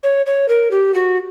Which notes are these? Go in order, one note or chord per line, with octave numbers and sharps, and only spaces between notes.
C#5
C#5
A#4
G4
F#4